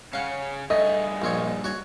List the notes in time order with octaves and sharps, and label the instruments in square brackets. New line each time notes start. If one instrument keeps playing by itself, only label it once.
[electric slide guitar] C#3 C#4 [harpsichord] F5 F#5
[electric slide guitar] G2 G#4 [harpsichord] A3 [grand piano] D#5
[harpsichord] A#1 C4 C#5
F#4 C#5